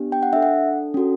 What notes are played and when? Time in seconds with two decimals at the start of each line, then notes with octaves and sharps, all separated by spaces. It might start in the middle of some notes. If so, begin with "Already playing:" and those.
Already playing: B3 D4 G4
0.12 G5
0.23 F#5
0.33 D4 A4 E5
0.43 F#5
0.94 C#4 F#4 A4